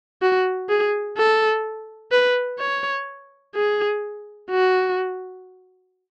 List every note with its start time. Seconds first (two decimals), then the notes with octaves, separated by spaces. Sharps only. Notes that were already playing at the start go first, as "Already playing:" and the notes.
0.22 F#4
0.69 G#4
1.18 A4
2.12 B4
2.60 C#5
3.56 G#4
4.51 F#4